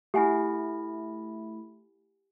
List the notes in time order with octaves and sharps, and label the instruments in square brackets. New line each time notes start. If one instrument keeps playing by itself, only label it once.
[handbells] A3 E4 [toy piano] G4 F#5 G#5